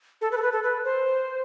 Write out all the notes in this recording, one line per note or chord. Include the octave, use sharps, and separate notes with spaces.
A4
B4
A4
B4
A4
B4
C5